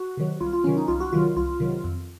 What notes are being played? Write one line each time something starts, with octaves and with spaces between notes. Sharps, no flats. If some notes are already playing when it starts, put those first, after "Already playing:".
Already playing: F#4
C3 D#3 F#3
C2 F4
F4
C3 D#3 F#3 C#4
D#4
C2 F4
F#4
C3 D#3 F#3 F4
C2 F4
C3 D#3 F#3
F2